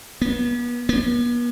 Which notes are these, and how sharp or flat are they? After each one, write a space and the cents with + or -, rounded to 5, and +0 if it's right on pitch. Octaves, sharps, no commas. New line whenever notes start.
B3 -35
B3 -45